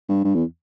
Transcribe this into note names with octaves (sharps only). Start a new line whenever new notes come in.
G2
G2
E2